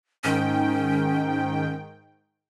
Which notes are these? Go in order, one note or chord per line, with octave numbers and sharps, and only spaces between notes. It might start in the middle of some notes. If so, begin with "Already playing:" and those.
G#2 D#3 C#4 G5